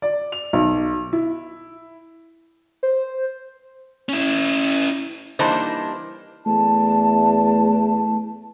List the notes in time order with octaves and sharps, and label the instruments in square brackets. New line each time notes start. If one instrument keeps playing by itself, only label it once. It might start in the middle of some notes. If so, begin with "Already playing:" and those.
[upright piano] D5
F7
B1
E4
[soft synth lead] C5
[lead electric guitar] C#4 E4
[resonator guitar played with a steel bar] E3 G3 A#3 D4 D#4 C5
[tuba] E2 [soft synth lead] A3 [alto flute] A5